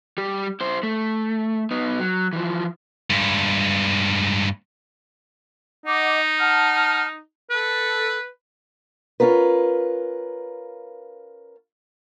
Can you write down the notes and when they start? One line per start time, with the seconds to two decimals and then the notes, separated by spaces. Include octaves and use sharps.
0.18 G3 G4
0.61 E4 C5
0.83 A3
1.71 B3 D#4
1.99 F#3
2.33 E3 F3
3.10 G2 G#3
5.86 D#4 D#5 F#5 D6
6.39 F#5 A5 F6
7.50 A4 B4
9.20 C#4 F4 A#4 B4